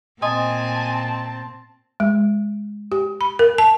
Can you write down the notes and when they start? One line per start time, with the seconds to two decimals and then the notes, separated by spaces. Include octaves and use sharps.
0.22 A#2 C4 D#5 G#5 A5 C6 D#6
2.00 G#3
2.92 G4
3.21 B5
3.39 A#4
3.58 A5